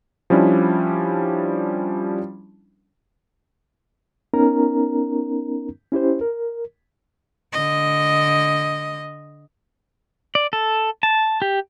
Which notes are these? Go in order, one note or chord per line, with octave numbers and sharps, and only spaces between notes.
F3 G3 C#4 D4 E4
B3 C#4 D#4 A#4 A#5
C#4 E4 G4 C5
A#4
D3 D#5
D5
A4
A5
G4